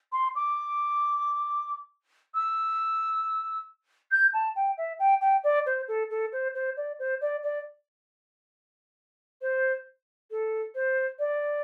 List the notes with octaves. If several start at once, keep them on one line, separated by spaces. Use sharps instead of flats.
C6
D6
E6
G6
A5
G5
E5
G5
G5
D5
C5
A4
A4
C5
C5
D5
C5
D5
D5
C5
A4
C5
D5